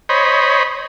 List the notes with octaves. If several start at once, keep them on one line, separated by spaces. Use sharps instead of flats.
C5 C#5 D#5 B5